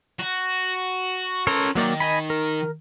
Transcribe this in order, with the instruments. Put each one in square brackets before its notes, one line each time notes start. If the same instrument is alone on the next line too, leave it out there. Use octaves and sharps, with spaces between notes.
[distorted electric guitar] F#4
[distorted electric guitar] C#4 C6 [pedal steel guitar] A4 A#4 C#5
[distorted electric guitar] D#3 [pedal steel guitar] F#3 A#3 D5
[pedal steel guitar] D#5 G#5 B5
A#4